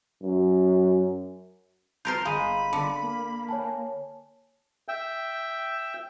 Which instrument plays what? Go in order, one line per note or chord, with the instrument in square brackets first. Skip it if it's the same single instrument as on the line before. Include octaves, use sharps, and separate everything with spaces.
[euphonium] F#2
[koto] F4 A#4 C5 [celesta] G6
[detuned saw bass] G1 [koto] G#3 [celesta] F5 D#7 [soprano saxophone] B5
[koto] D3
[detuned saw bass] A#3
[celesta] C#5 G#5 A5
[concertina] E5 G5